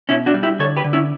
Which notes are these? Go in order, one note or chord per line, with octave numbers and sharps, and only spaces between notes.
B2 C#4 E4
D4 F#4
G3
E4 G4
D3 A4 C#5
G4 B4
D3
C#4 E4